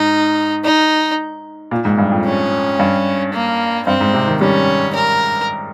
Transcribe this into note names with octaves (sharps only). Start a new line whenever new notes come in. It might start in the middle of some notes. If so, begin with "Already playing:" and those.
Already playing: G#2 D#4
D#4
A#2
G#2
G2
F2
C#4
G2
A#3
G2 C4
G#2
C3
D#3
G3 C#4
A#4